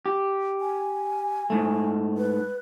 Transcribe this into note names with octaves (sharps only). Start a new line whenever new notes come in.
G4
G#5
G#2 A3
B4